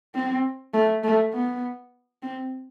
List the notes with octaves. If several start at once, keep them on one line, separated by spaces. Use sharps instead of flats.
C4
A3
A3
B3
C4